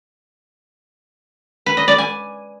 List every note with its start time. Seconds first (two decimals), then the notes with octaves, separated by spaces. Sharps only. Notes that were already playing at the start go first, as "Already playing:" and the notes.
1.66 B4
1.77 D#5
1.88 D5
1.98 G#5